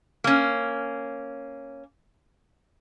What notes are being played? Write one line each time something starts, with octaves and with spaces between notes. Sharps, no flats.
A#3 C#4